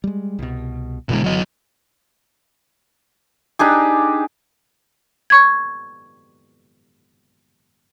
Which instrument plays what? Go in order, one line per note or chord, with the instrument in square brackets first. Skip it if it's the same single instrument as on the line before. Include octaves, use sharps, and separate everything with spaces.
[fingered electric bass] G3 G#3
C2 B2
[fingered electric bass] F#1 D3 E3 [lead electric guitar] B2 G#3
[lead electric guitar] F#3 D#5
[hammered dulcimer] D4 D#4 G4 G#4
[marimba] C#6 G#6